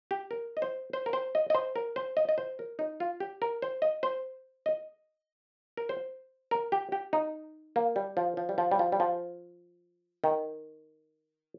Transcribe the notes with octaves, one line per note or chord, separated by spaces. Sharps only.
G4
A#4
D#5
C5
C5
A#4
C5
D#5
D#5
C5
A#4
C5
D#5
D#5
C5
A#4
D#4
F4
G4
A#4
C5
D#5
C5
D#5
A#4
C5
A#4
G4
G4
D#4
A#3
G3
F3
F3
G3
F3
G3
F3
G3
F3
D#3